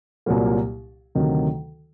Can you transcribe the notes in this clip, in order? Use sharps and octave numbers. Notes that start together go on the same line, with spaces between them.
C2 A#2 F#3 A#3
D2 C3 D#3 F#3